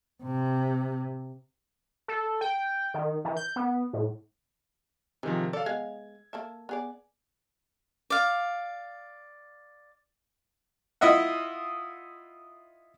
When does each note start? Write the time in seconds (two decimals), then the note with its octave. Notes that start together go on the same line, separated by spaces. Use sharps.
0.23 C3
2.08 A4
2.41 G5
2.94 D#3
3.25 E3
3.37 G6
3.56 B3
3.93 A2
5.23 C3 D#3 F3 G#3
5.53 A4 D5 F5
5.66 G#3 B3 F5 G#6
6.33 A#3 A4 E5
6.69 B3 G#4 D5
8.10 D5 F5
11.01 E4 F4 D#5 E5 F#5